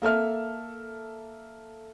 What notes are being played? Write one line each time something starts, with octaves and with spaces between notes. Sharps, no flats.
A#3 A4 E5 F6